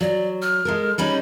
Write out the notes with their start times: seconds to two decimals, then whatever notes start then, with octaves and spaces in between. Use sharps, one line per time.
0.01 F#3 D5
0.42 F6
0.65 G#3 A4 A#4
0.98 G3 C#4 D#4 B5